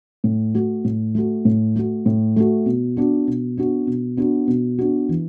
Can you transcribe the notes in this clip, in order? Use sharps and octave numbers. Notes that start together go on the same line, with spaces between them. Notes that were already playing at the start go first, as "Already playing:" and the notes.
A2
A3 F#4
A2
A3 F#4
A2
A3 F#4
A2
A3 F#4
B2
B3 D4 F#4
B2
B3 D4 F#4
B2
B3 D4 F#4
B2
B3 D4 F#4
E3